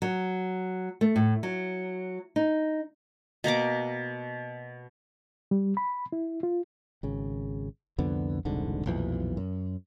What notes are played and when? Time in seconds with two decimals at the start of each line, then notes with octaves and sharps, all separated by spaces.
0.02 F#3
1.01 A3
1.16 A2
1.43 F#3
2.36 D#4
3.44 B2 A#3 A#5 D6
5.51 G3
5.77 B5
6.12 E4
6.43 F4
7.03 G#1 C#3
7.98 C2 F2 D3 B3
8.45 E1 C2 G#2 D3
8.86 B1 F2 A#2 E3
9.37 F#2